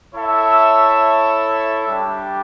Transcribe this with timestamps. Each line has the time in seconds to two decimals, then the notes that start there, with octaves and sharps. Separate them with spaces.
0.13 E4 A4 C#5 E5
1.85 G3 D4 G4